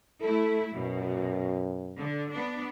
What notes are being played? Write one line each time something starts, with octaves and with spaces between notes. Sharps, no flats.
A3 E4 A4
F#2 B2
D3
B3 D4